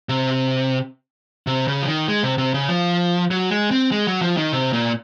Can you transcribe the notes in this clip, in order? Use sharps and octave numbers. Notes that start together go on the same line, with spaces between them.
C3
C3
C#3
F3
D#3
G#3
C3
C3
C#3
F3
F#3
G#3
C4
G#3
F#3
F3
D#3
C3
A#2